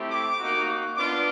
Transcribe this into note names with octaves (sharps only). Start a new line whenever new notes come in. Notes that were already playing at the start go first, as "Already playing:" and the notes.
Already playing: A3 C4 E4 G4
D6
A#3 D#4 F#4
B3 D4 F4 D6